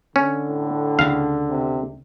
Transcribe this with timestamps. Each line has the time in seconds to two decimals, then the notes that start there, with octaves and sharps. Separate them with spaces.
0.16 D3 C#4
0.48 A2
0.99 D2 C#3 F5
1.50 C3